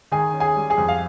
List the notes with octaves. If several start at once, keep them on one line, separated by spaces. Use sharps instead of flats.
D#3 G#4 G#5
C#4
G#4 G#5
G3
G#4 G#5
F2
F5